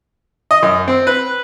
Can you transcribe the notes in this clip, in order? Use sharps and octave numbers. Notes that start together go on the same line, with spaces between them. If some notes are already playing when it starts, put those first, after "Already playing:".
D#5
F#2
C4
B4